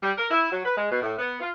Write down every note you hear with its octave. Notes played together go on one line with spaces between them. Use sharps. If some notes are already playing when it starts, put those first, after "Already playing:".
G3
A#4
E4
F#3
B4
G#3
B2
A2
B3
F4